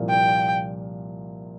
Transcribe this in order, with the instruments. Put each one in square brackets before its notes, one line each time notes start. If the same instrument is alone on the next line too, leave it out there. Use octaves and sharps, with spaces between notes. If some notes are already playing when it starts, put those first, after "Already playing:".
Already playing: [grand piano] C2 A#2 F3 A#3
[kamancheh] G5